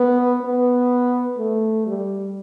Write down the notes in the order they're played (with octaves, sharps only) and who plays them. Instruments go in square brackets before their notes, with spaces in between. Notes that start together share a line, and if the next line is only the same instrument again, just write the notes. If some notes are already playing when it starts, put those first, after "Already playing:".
Already playing: [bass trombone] B3
B3
A3
G3